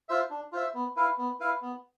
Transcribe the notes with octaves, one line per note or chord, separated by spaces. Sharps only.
F4 C5 E5
D4
F4 C5 E5
B3
E4 B4 F5
B3
E4 B4 F5
B3